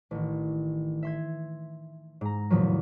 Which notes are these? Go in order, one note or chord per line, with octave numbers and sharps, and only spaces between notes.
A1 D#3
E5 C6 G#6
G#2 A#5
E2 A2 C3 D#3 F3 F#3